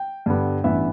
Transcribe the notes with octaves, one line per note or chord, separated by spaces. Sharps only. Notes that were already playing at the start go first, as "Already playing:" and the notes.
Already playing: G5
G2 D3 G3 B3
A1 G2 E3 B3 E5